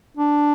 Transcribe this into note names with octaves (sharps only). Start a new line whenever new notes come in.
D4